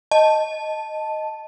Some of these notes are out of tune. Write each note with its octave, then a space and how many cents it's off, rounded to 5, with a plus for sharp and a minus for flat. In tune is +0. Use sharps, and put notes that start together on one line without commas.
D#5 +0 A5 +0